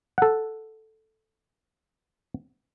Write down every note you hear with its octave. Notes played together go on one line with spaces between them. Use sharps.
A4 F#5